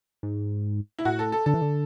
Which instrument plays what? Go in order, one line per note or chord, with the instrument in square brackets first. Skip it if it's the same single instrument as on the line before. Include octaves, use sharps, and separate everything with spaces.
[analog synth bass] G#2
[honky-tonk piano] E4
[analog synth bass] A2 [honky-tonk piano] F#4
[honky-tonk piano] A4
A4
[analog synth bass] D3 [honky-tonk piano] A4
[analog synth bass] E3
D3